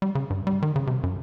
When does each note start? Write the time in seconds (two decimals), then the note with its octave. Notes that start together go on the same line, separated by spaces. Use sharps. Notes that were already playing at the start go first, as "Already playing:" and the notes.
0.02 G3
0.15 C#3
0.30 G2
0.47 G3
0.62 D#3
0.76 C#3
0.87 C3
1.03 F#2